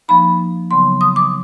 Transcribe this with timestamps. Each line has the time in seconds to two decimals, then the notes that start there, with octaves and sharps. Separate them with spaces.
0.08 F3 A#3 D#4 B5
0.71 C#3 F#3 B3 C6
1.01 D#6
1.16 D6